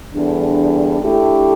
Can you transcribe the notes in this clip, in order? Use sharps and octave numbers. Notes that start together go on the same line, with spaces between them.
E2 D3 G3 D4
D3 A3 E4 G4